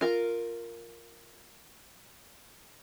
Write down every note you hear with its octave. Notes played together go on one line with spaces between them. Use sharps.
F4 A#4